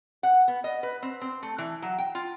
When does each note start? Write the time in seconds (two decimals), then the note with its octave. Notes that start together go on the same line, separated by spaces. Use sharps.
0.23 F#5
0.48 B3
0.64 D#5
0.83 B4
1.03 C4
1.21 C4
1.43 A3
1.58 E3
1.82 F#3
1.98 G5
2.15 F4